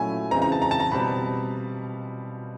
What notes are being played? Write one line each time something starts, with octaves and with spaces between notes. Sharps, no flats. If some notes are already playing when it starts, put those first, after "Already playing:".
Already playing: A#2 F#3 A3 C#4 E4 G#5
C#3 E3 G#3 C4 A#5
A#5
A5
A#5
A5
A#5
B2 G3 C4 B5